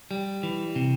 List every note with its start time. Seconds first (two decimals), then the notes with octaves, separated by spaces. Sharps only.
0.11 G3
0.43 E3
0.76 C3